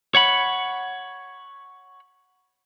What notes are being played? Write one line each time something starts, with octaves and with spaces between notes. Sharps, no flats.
C#5 F#5 B5